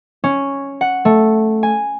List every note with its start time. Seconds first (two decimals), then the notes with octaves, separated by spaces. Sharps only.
0.24 C#4
0.81 F#5
1.05 A3
1.63 G#5